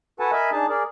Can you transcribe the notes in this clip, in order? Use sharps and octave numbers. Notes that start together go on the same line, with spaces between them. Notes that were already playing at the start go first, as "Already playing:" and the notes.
F#4 A4 B4 F#5 G#5 A5
A#4 D#5 E5 G#5 B5
D4 D#4 G#4 A5
G#4 A#4 D5